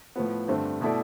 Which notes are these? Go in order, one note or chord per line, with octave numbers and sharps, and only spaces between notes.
A2 F3 B3
G2 D3 A3 C4
B2 A3 E4 A4 D5